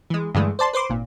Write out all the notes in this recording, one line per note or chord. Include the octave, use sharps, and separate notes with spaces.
E3 G#3
G2 D3 E3 G#3 A3
C5 D5 A5 C6
B4 C5 C6 D6
G#1 A#2